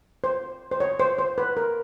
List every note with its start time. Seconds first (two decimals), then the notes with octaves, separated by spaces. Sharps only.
0.24 C5
0.71 C5
0.80 C#5
0.99 C5
1.19 C5
1.38 B4
1.57 A#4